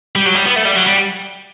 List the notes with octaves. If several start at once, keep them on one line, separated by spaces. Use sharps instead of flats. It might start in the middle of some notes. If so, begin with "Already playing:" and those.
G3
F#3
G3
B3
A3
G3
F#3
G3